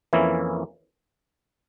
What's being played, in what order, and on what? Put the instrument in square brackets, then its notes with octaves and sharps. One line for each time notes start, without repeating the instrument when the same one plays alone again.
[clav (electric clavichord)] F2 E3 A#3 C#4 E4